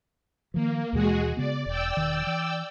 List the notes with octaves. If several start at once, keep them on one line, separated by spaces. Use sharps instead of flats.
D#3 F3 A#3
D#2 B2 E3 G#3 F#4 G#4
C#3 B3 D5
E1 D5 G5 E6
E1 D#3
E3